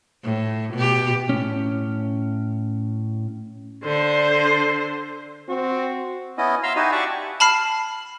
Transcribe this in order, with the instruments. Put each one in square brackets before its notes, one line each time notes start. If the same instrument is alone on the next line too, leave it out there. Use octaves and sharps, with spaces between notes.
[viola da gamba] A2
B2 G4
[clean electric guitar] A2 C#4
[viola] D3 C5
[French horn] C4 [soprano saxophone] F#4
[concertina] B3 C#4 E4 D#5
E5 F5 A#5 C6 E6
D#4 E4 F#4 G4 D#5 G#5
G4 D5 E5 F#5 A5 C#6
[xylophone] A5 B5 F6 C7